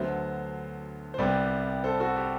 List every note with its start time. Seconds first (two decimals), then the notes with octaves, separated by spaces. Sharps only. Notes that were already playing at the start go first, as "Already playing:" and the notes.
Already playing: D2 D3 F#3 B3 C5 E5
1.14 C5
1.18 C2 C3 G3 B3 B4 D5
1.84 A4 C5
2.00 F#4 A4
2.16 G4